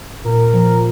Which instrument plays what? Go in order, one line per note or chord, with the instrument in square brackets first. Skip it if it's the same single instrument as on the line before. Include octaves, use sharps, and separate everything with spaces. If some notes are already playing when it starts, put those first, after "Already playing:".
[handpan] A#2 [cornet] A#4
[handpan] F3